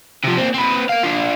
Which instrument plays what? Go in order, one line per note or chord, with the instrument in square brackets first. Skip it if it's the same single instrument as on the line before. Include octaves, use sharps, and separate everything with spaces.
[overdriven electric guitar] C3 F3
A#3 C4
C4 B4
A#4 F5
D4 F4